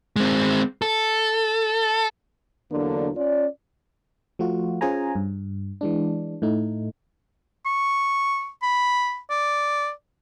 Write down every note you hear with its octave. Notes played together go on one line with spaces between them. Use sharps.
G#3 C4
A4
E2 D3 F#3 A#3 D4
C#4 F4 D5
F3 A3 F4 F#4
C#4 F4 G#4 C5 G#5 A#5
G2
E3 G#3 D4
A2 A3 D#4
C#6
B5
D5